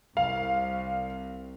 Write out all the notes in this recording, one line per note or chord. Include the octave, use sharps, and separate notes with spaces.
C2 F5